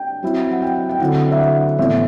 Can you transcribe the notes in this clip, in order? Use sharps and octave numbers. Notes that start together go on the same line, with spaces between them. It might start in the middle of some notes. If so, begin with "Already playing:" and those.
Already playing: G5
F#3 C4 E4
F#5
G5
G5
D3 F#3 C4 E4 F#5
E5
F#5
A2 E3 B3 E5